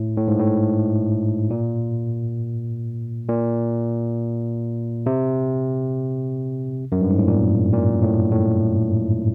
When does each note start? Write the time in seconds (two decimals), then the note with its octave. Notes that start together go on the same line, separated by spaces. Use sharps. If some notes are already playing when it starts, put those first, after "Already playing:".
Already playing: A2
0.17 A2
0.28 G#2
0.40 A2
1.50 A#2
3.28 A#2
5.06 C3
6.92 F#2
7.01 G2
7.10 G#2
7.19 A2
7.28 A#2
7.73 A#2
8.03 A2
8.32 A2